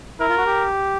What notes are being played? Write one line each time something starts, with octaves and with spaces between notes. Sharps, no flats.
E4 A#4
F4
F#4
G4